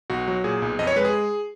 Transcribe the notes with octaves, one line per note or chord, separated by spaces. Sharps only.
B1 F#4
F#3
A#2 G#4
B1
F2 D#5
C#5
G#3 B4
G#4